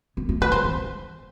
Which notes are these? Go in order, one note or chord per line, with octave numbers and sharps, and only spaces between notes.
B3
A3
F3 B4
D3 C5
E3